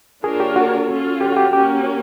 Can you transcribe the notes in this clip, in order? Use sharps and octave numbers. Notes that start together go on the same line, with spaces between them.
A#3 D4 F4 G#4 A#4 C#5
G4
F#4
C#4 F4 A4
G4
F#4
G4
A#3 C#4 F#4 G4 A#4